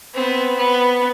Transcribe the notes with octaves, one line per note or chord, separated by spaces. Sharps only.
B3 C4
B3